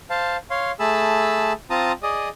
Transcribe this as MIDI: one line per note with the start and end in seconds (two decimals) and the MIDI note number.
0.10 0.37 72
0.10 0.37 77
0.10 0.37 81
0.51 0.71 73
0.51 0.71 77
0.51 0.71 84
0.80 1.53 57
0.80 1.53 68
0.80 1.53 81
0.80 1.53 83
0.80 1.53 88
1.70 1.92 60
1.70 1.92 65
1.70 1.92 81
1.70 1.92 82
1.70 1.92 87
2.03 2.29 68
2.03 2.29 74
2.03 2.29 75
2.03 2.29 87